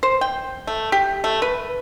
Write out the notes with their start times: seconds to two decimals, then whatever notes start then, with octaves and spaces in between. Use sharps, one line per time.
0.03 C5
0.21 G5
0.67 A3
0.92 G4
1.24 A3
1.42 B4